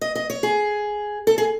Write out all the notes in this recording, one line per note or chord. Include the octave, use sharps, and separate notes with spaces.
D#5
D#5
C#5
G#4
A4
G#4